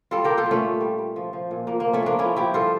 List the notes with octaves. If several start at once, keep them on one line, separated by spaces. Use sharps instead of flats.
G3 F4 A4
G3 G4 A#4
F4 A4
A#2
A3 C#4
A#2
G3
G3
F3
F3
A#2
A#2 A#3
F3 A#3
A3 C#4
F3 A#3 D4
F3 C#4 E4
F3 E4 G4
G2 F4 A4